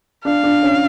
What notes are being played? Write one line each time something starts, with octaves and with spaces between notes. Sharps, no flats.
D4 F5
D4
C#4